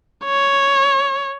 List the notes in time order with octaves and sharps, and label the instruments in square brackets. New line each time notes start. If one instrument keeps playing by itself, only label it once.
[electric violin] C#5